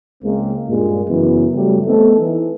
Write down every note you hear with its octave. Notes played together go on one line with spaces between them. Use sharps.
C#2 C#3 G#3 A#3 C4
G2 A#2 G#3
F#2 C#3 E3 B3
C#3 F#3 G3 A3 B3 G4
A3 B3 C4 D#4 A4
E3